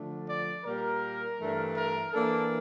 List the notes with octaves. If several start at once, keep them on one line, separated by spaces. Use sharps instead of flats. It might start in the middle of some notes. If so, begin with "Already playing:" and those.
Already playing: D3 F3 A3 D4
D5
A#2 G3 A#3 A#4
G2 E3 A3 D4
A#4
E3 A#3 D4 A4